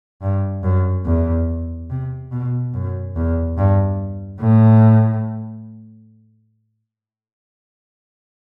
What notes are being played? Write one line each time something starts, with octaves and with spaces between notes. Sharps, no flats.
G2
F#2
E2
C3
B2
F#2
E2
G2
A2